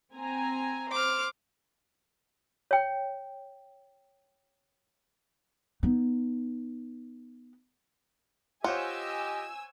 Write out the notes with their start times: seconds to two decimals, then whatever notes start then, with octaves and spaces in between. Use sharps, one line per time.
0.14 C4 G#5 A#5
0.92 C5 D6 F6
2.71 C#5 G5
5.83 B3 D#4
8.64 F4 G4 C5 C#5 D#5 F#5 G#5 E6